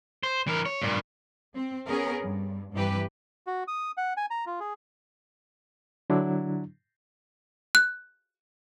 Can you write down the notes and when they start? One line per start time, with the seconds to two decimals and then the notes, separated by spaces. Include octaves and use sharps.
0.23 C5
0.47 E3 A#4
0.66 C#5
0.82 G2 A#2
1.55 C4
1.86 B3 C#4 G#4 A#4
2.22 G2
2.73 G2 C3 E3 G4 B4
3.47 F#4
3.68 D#6
3.97 F#5
4.17 G#5
4.31 A#5
4.46 F4
4.60 G#4
6.10 D3 F#3 D4 E4
7.75 F#6